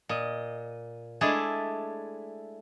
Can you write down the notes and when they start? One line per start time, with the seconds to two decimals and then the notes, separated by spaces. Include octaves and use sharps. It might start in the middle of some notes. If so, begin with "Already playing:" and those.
0.09 A#2 D#5
1.21 G#3 A3 D4 E4 G#4 A5